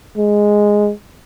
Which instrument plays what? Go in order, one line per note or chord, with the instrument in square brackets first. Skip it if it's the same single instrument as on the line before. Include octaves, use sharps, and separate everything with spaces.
[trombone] G#3